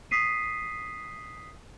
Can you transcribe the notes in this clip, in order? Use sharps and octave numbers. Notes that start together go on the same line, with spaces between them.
D#6 B6 C7 D#7